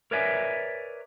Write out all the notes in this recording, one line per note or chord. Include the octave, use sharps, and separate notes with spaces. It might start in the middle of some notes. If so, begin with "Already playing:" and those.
A#4 B4 C#5 D5 E5 G#5